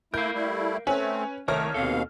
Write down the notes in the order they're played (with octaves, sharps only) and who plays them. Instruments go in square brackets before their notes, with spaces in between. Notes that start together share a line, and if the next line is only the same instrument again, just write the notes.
[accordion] A3 E4 [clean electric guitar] A#4 F5 [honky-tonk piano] G6
[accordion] G3 A3 E4
[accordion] A3 C4 [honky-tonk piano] C#4 G#5 [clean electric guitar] B4
[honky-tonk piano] C2 C#5 F6 [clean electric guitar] D#3 A#4 A#5 [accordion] A3
[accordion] D#2 B2 F5 [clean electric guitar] C4 A4